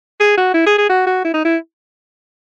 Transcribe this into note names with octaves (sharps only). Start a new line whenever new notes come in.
G#4
F#4
E4
G#4
G#4
F#4
F#4
E4
D#4
E4